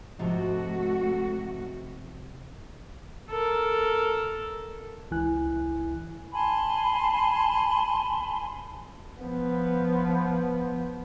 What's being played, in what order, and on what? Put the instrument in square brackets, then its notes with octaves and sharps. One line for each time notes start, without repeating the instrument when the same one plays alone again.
[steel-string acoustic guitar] G#2 C3 F3 [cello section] A3 F#4
[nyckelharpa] A4 A#4
[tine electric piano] C#2 E3 E4 G#5 F#6
[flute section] G#5 A5 B5 C6
[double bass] F3 B3